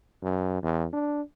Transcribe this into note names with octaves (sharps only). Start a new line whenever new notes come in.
F#2
E2
D4